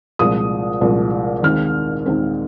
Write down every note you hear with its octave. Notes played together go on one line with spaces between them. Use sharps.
C2 A#2 F3 G#3 D#6
C2 A#2 F3 G#3
D#2 D#3 G#3 C4 F6
D#2 D#3 G#3 C4